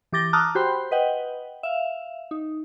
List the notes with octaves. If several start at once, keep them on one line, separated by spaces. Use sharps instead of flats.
E3 G4 D6 A6 A#6 G7
A5 A#5 D6 D#6 F6 F#6
F#4 G4 C5 G5 B5 C6
B4 D#5 F#5 G5
E5 F5
D#4